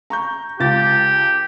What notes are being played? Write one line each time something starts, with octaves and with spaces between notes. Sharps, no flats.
A#5 C#6 G6
C#2 F4 G4 A6